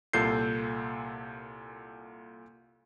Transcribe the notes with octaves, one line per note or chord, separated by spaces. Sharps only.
C2 A#2 A4 G6 C7